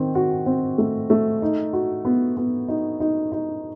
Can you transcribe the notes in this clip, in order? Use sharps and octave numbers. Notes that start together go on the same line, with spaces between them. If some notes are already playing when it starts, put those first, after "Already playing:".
Already playing: D#3 C4
F#4
C4
A3
A3
D#4
F#4
B3
B3
D#4
D#4
D#4